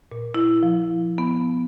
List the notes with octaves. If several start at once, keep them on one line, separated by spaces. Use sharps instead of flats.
A#2
E4
F3
B3